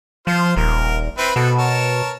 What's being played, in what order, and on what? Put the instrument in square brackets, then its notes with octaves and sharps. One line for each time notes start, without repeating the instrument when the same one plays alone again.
[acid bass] F3 [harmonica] F4 C5
[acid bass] D#1 [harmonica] A#4
[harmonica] C4 E4 B4
[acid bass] B2 [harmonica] F#4 A4
[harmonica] A#4 C#5 A5